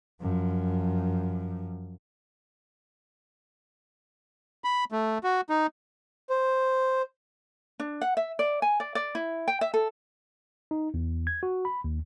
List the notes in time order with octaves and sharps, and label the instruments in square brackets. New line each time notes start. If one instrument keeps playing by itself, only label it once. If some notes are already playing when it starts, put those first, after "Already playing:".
[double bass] F#2 F3
[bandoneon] B5
A3
F#4
D#4
[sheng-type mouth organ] C5
[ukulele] D4
F#5
E5
D5
G#5
D5
D5
E4
G5
E5
A4
[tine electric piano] D#4
E2
G#6
F#4
B5
D#2